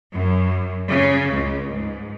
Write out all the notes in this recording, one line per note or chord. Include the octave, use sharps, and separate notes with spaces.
F#2
C#3
C#2
G#2